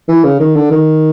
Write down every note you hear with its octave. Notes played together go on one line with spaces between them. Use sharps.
E3
C#3
D#3
D3
D#3